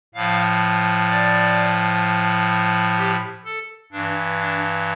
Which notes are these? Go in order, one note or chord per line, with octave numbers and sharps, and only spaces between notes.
A2 F3 F5
D5
G4
A4
G2 E3 D4
D4